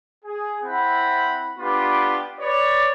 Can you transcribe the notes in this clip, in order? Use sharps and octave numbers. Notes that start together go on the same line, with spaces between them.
G#4
C4 E4 F#5 B5
B3 D4 F4 G4 B4
B4 C#5 D5